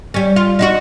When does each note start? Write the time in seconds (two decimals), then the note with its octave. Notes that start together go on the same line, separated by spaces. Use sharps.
0.14 G3 C#4
0.36 F4
0.59 D#4 F4 F#4